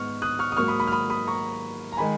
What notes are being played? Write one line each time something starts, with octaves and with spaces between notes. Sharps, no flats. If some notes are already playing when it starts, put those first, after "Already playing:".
Already playing: G#2 B3 C#6 F6
D#6 F#6
C#6 F6
D#6
G#2 F#3 A#3 C#6 F6
B5 D#6
B5 D#6
F6
B5 D#6
B5 D#6
A#5 C#6
A#5
D#3 G#3 G#5 B5